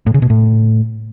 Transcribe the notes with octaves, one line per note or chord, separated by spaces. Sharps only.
A2
C#3
B2
A2